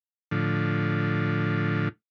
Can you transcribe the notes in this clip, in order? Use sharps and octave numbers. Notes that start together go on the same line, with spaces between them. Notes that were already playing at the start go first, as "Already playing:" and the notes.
A2 D3 F3